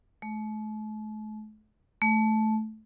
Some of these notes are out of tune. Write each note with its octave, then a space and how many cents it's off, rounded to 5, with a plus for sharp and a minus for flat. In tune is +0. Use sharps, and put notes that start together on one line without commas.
A3 -40
A3 -15